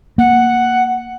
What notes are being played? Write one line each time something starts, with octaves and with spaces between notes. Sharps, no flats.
A#3 F#5